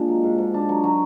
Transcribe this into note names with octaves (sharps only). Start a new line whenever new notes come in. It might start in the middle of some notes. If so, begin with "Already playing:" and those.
Already playing: A#2 G#3 D4
F#3
G#2
G#2
D4
F#3
F#3